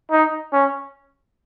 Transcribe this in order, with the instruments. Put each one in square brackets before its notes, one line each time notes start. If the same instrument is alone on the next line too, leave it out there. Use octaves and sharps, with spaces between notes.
[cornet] D#4
C#4